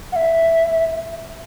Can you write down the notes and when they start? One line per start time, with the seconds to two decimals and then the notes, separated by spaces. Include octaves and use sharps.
0.12 F#5
0.16 E5